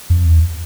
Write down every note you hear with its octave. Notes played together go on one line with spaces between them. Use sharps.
F2
E2